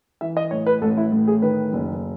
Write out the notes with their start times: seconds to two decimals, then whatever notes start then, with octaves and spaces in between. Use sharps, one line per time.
0.21 E3 E5
0.37 D#5
0.51 A2 C#5
0.66 B4
0.81 A1 A4
0.97 E4
1.12 A2
1.28 G#4
1.42 D#3 B4
1.73 F#1